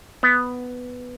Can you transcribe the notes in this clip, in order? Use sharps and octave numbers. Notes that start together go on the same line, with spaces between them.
B3